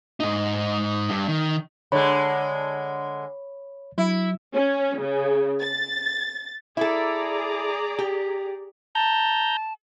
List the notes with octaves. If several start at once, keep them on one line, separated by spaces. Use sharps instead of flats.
G#2 D#4
G2
D#3
D3 G#3 C#5 B5
F#3 E4
C#4
C#3
A6
E4 G#4 A4 D5 A#5
G4
A5 A#5 G6